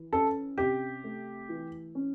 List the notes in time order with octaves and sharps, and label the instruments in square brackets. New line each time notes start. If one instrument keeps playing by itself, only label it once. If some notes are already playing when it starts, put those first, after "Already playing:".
Already playing: [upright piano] E3
[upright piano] C#4 [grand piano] A4
[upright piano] C3 [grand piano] G4
[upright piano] A3
E3
C#4